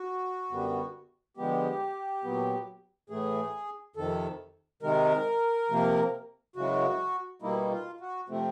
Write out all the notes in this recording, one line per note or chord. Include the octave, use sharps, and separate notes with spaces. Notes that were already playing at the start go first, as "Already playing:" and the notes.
Already playing: F#4
F#2 D3 G3 B3
D3 F3 G#3 B3 G4
A#2 F#3 B3
A2 E3 A3 G#4
F2 C3 D#3 A4
C3 D#3 G#3 A#4
C3 F3 A#3
F#2 C#3 E3 G#3 F#4
B2 G3 A#3 D#4 E4
F4
F#4
C3 F3 A3 C4